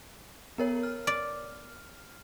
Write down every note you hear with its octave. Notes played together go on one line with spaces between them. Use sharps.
B3 A#4 C#5
F6
D5